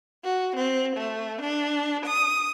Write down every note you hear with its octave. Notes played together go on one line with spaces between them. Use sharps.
F#4
C4
A3
D4
D#6